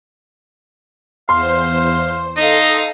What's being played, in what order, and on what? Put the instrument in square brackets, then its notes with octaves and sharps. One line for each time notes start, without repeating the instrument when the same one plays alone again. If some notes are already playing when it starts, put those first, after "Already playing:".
[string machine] E2 C5 [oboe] F5 [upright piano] C6
[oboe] D#4 [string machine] A4 [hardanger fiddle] D#5 F5